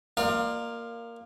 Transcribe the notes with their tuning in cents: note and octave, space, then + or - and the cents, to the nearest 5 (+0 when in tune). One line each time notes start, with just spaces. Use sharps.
A#3 -5 F4 +0 D5 +35